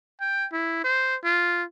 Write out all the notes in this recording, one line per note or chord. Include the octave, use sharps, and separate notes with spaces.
G5
E4
C5
F4